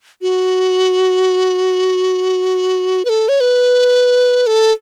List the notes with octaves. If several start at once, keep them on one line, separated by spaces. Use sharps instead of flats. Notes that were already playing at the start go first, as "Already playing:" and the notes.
F#4
B4
A4
C#5
B4
A4